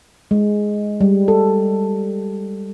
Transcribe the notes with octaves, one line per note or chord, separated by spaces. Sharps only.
G#3
G3
A4